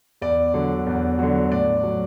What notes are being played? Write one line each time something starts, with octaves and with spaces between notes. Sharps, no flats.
E2 D5
D3 F#3
E2
D3 F#3
A2 D5
F#3